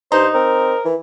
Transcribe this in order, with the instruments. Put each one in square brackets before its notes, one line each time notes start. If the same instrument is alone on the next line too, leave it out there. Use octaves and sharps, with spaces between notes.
[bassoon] G2 [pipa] D#4 [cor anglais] C5
[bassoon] C4 [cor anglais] A#4
[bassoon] E3